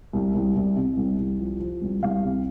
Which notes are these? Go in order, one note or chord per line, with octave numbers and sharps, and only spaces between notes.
C2
C2
C2
C3
C2
C2
F3
F3
C2
C2 F5
C3